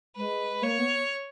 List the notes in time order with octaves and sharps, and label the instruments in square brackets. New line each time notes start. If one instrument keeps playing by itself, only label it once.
[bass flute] G#3 [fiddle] B4
[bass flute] A#3 [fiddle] C#5
[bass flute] B3